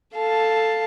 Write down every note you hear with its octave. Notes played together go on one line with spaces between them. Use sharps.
A4 F5 A5